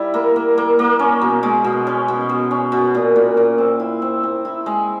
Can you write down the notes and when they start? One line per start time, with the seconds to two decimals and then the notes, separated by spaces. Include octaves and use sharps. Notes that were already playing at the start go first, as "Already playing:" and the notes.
Already playing: G3 E4
0.14 A#3
0.36 A#3
0.58 A#3
0.79 A#3
0.99 C#4
1.21 B2
1.43 G#3
1.64 B2
1.87 C#4
2.08 B2
2.29 B2
2.51 C#4
2.72 B2
2.95 A#2
3.16 A#2
3.37 A#2
3.58 C4
3.80 E4
4.02 C4
4.23 C4
4.45 E4
4.66 G#3